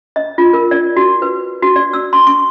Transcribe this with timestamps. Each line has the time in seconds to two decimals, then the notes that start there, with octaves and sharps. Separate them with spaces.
0.16 D#5
0.38 F4
0.53 A#4
0.71 D5
0.96 F#4
1.22 B4
1.62 F#4
1.76 D5
1.93 E6
2.13 C6
2.27 C#6